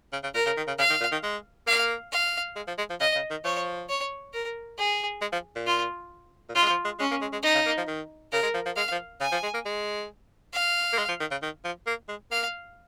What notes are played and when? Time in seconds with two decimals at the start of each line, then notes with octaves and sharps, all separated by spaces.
0.13 C#3
0.24 C#3
0.34 A#2 A#4
0.46 C#3
0.57 D#3
0.68 C#3
0.79 C#3 F5
0.90 D#3
1.01 A#2
1.12 D#3
1.23 G#3
1.67 A#3 F5
2.12 F5
2.56 G#3
2.68 F3
2.78 G#3
2.90 F3
3.00 C#3 D#5
3.15 C#3
3.31 D#3
3.45 F3 C#5
3.89 C#5
4.33 A#4
4.78 G#4
5.22 G#3
5.33 F3
5.56 A#2
5.67 F4
6.49 A#2
6.55 C#3 F4
6.62 G#3
6.70 F3
6.85 G#3
6.99 G#3 C#4
7.11 A#3
7.21 G#3
7.33 G#3
7.43 D#4
7.55 C#3
7.66 A#3
7.77 F3
7.88 D#3
8.32 C#3 A#4
8.43 G#3
8.55 F3
8.66 F3
8.76 G#3 F5
8.92 F3
9.21 C#3 G#5
9.32 F3
9.43 G#3
9.54 A#3
9.66 G#3
10.54 F5
10.93 A#3
10.98 G#3
11.09 F3
11.20 D#3
11.31 C#3
11.43 D#3
11.65 F3
11.87 A#3
12.09 G#3
12.31 A#3 F5